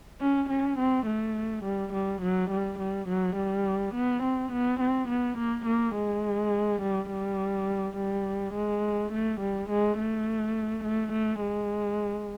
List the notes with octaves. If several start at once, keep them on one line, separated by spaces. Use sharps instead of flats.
C#4
C#4
C4
A3
G3
G3
F#3
G3
G3
F#3
G3
B3
C4
B3
C4
B3
A#3
A#3
G#3
G3
G3
G3
G#3
A3
G3
G#3
A3
A3
A3
G#3